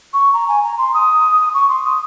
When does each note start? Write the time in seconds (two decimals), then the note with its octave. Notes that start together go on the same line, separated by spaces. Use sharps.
0.14 C#6
0.33 A#5
0.48 G#5
0.64 A#5
0.78 C6
0.94 D#6
1.54 C#6
1.69 C6
1.85 D#6